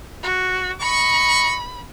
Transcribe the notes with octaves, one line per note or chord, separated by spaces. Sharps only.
F#4
D#5 B5 C#6